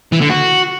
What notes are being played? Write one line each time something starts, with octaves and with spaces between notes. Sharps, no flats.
E3
D3
F#4